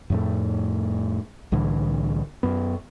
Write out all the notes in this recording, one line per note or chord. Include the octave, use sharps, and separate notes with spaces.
F2 A2 A3
C2 A2 D3 E3
F#2 B3